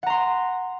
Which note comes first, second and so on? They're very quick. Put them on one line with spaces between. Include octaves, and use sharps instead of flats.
F#5 A#5 C6